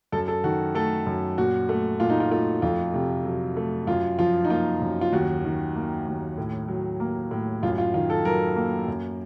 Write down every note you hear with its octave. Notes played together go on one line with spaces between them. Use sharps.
F#2 A4
A4
D#3 F#4
A3 A4
F#2
A#2 F#4
A3
A#2 F4
D#4
F4
A3 F4
F2 F4
C3
F#3
A3
F#2 F4
F3 F4
D#4
A#3 F4
F#2
F4
D#2 F#4
D#3
A#3
D#2
A2
F#3
A#3
A2
F#2 F4
F4
D#3 F4
A4
F#3 A#4
A#3
F#2